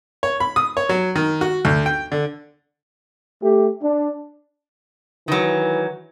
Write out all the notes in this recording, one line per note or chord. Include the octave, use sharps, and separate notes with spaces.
C#5
B5
D#6
C#5
F#3
D#3
F#4
D2
G5
D3
A3 G4
D4
D#3 E3 F#3